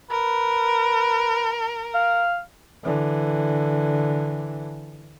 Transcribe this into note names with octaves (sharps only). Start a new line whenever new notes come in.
A#4 B4
F5
D3 E3